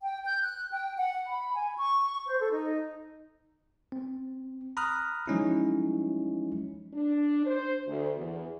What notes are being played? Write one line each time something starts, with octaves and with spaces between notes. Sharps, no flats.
G5
G6
F#6
G5
F#5
B5
G#5
C#6
C5
A4
D#4
C4
A#5 B5 D#6 F6 F#6
F3 F#3 G#3 C#4 D#4 E4
D4
C5
D2
E2